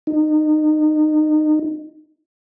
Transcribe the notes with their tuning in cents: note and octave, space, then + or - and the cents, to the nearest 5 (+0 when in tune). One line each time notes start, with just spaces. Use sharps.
D#4 -25